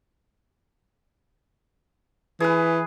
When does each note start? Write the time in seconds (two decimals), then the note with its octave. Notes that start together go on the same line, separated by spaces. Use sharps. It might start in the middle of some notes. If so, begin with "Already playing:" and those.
2.40 E3 G#4 B4